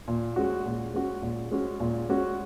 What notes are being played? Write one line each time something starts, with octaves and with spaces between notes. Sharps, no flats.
A#2
G#3 C#4 F#4
A#2
G#3 C#4 F#4
A#2
G#3 C#4 F#4
A#2
G#3 C#4 F#4